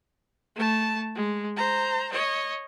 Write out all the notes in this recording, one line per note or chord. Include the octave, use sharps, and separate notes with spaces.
A3 A5
G#3
C5 A#5
C#5 D#5